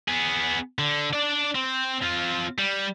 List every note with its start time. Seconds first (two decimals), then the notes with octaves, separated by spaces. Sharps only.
0.08 B3 G#4
0.79 D3
1.13 D4 D5
1.55 C4
2.03 C4 F4
2.58 G3